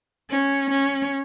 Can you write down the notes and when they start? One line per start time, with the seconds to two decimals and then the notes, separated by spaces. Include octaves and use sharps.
0.30 C#4
0.70 C#4